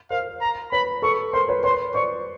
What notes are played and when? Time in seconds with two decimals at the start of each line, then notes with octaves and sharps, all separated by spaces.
0.10 A#4 C5 F5
0.41 A#5
0.72 B4 C#5 B5
1.02 A4 B4 C#6
1.33 A#4 C5 C6
1.48 B4 C#5
1.64 B4 C#5 C6
1.94 C5 D5 C#6